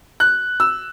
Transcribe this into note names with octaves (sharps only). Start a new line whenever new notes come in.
F#6
E6